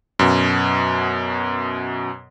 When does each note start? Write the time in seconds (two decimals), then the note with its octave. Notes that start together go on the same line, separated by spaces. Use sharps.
0.19 F#2 B2